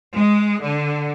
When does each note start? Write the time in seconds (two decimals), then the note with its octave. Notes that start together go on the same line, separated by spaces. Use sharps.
0.14 G#3
0.63 D3